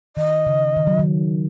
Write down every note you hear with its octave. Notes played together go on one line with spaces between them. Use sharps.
D#3 D#5
C#3
D#3
F#3
D#3